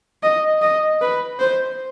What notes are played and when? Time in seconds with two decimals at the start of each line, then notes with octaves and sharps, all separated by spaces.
0.23 D#5
0.62 D#5
1.02 B4
1.39 C5